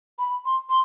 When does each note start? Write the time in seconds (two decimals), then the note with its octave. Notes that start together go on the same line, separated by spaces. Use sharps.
0.19 B5
0.45 C6
0.69 C6